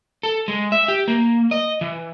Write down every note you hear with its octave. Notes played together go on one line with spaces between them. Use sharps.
A4
G#3
E5
G4
A#3
D#5
E3